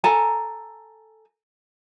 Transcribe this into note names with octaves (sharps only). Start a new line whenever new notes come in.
A4 G#5 A#5